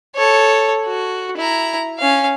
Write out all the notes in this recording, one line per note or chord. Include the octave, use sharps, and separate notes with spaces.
A4 C#5
F#4
E4 A#5
C#4 F5